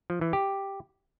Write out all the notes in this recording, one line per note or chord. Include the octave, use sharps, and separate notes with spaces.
F3
E3
G4